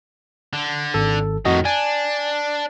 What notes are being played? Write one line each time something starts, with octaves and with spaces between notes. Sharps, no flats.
D3
G#1 A4
F2 A2 D#3 F#4 D#5
D4 G#5